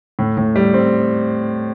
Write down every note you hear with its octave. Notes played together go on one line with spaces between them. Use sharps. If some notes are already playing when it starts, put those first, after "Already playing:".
A2
A2
G3
C4